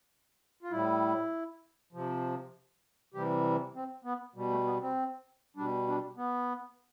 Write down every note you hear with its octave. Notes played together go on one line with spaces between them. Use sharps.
F4
A2 G3 E4
C3 F3
C3 E3 G3 G4
C4
B3
B2 G3
A3
B3
C4
B2 G3 D4
D4
B3